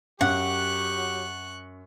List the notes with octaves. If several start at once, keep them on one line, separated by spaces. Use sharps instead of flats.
F#2 F#3 G4 F#5 C#6 F#6